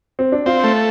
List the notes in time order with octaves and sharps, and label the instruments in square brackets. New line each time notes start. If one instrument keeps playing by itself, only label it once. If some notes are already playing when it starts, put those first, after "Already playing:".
[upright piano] C4
D4
[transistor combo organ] C4 [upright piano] F4
[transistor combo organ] A3